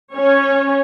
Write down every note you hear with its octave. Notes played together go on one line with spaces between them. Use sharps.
C#4 C#5